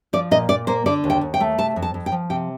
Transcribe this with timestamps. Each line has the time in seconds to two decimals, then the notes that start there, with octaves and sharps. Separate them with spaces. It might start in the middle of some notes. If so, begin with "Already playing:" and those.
0.13 F3 D5
0.31 A#2 D#5
0.49 A#2 D5
0.67 A#3 C5
0.86 D3 D5
1.04 D#2
1.10 G5
1.21 D#2
1.34 G5
1.40 A3
1.58 C3 A5
1.76 F2
1.82 A5
1.94 F2
2.06 G5
2.12 F3
2.30 C3 G5